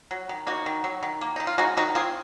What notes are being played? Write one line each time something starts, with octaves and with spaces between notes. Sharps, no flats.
F#3
D#3
A#3 D#4 F#4
D#3
F#3
D#3
A#3
D#3 D#4
F4
G#3 D#4 F#4
D#3 D#4 F#4
C4 F4 G#4